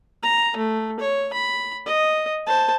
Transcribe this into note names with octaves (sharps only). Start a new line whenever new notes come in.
A#5
A3
C#5
B5
D#5
C5 A5